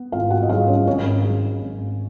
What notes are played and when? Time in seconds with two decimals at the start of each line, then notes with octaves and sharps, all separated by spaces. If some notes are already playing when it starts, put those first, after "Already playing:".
Already playing: B3
0.12 G#1 F4 F5
0.30 F#4 F#5
0.43 D#5
0.49 G#2 F#3 F4 F5
0.68 C#4 C#5
0.87 G#1 C#4 C#5
1.24 G#2 F#3
1.62 G#1